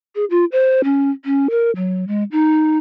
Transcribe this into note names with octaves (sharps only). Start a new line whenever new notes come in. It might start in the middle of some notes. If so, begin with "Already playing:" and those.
G#4
F4
C5
C#4
C#4
A#4
F#3
G#3
D#4